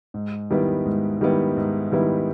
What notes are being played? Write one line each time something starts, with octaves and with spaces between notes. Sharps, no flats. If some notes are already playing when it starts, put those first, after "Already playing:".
G#2
D#3 G3 B3 E4
G#2
D#3 G3 B3 E4
G#2
D#3 G3 B3 E4